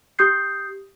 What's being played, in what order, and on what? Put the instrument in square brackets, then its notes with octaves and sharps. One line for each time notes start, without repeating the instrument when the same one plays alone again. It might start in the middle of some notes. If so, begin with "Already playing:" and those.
[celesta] G4 D#6 G6 C7